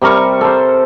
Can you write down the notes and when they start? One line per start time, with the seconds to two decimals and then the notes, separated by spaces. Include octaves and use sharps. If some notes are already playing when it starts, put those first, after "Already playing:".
0.01 C3 G3 A#4 C#6
0.41 A4 C5